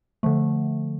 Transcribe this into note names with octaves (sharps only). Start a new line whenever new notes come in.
D3 F3 A3